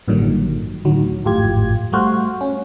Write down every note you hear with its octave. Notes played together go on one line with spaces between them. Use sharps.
A1 G2 A#2 D3 D#3 F#3
D2 A2 D#3 F#3
G#1 F2 A2 F4 G4 G#6
G3 A3 F#4 C5 F5
C#4